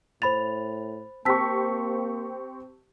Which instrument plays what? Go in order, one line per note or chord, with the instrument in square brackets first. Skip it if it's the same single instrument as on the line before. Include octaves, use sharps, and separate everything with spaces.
[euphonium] A2 [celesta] C5 B5 A6 [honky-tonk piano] F7
[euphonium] A#3 [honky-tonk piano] C4 G4 C#6 [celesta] A5 E6 B6